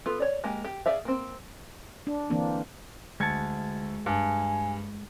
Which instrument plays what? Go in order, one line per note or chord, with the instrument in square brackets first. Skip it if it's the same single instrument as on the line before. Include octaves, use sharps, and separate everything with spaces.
[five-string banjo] B3 F4 A4
C#5 D5
G#3 A#3 G4
G4
G#4 D5 E5 F5
A#3 C4
[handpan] D4
D3 E3 A#3 C4 D4
[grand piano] D2 G#6 C#7 [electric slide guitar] G#3 A5
[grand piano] G2 [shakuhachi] G#5